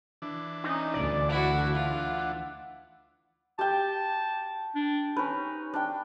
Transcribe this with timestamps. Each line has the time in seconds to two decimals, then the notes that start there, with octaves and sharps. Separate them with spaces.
0.22 E3 D4
0.64 C#4 D#4
0.94 D2 D5
1.29 E4 F#4 F#5
1.75 F4
3.59 G4 G5 A5
4.75 D4
5.16 C#4 D#4 B4
5.74 D4 G5